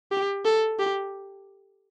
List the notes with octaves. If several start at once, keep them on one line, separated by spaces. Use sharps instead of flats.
G4
A4
G4